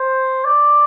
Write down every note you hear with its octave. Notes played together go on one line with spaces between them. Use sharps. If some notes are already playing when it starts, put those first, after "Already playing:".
Already playing: C5
D5